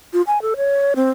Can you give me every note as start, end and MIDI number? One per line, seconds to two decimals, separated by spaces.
0.13 0.22 65
0.27 0.41 80
0.42 0.54 69
0.57 0.94 73
0.96 1.10 60